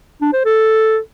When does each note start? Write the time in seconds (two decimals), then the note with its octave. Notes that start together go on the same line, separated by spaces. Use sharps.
0.22 D4
0.33 C5
0.45 A4